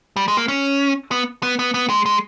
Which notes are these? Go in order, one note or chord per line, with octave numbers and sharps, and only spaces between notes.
G3
G#3
A#3
C#4
B3
B3
B3
B3
G#3
G#3